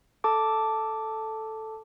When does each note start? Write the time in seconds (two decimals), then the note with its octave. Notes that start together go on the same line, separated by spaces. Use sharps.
0.24 A4 A5 D6